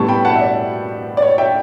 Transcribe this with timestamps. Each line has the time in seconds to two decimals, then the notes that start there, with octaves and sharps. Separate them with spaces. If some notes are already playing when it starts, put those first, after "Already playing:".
Already playing: A2 G3 B3 A5 C#6
0.08 G5 B5
0.25 F#5 A5
0.36 E5
0.41 D5
1.17 D5
1.22 C#5
1.38 E5 G5